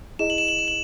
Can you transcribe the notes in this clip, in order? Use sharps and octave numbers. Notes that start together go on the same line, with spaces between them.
E4 G#4 D#5 E7
F#7
E7
F#7
E7
F#7